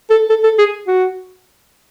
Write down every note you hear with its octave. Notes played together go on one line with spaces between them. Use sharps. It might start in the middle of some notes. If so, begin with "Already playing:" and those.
A4
A4
A4
G#4
F#4